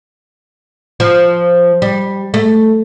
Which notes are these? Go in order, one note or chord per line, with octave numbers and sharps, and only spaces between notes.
F3
G3
A3